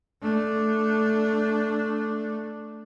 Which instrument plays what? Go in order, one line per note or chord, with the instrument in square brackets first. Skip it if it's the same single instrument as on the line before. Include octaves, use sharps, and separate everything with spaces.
[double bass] A3 D4